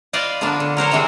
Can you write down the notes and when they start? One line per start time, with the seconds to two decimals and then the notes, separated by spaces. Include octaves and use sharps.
0.13 F4 B4 C5 D5 D#5
0.41 D3 F3 A#3 B3 D4
0.60 D3
0.77 F#3 A#4 C5 C#5
0.91 C3 D#3 E3 G#3 C4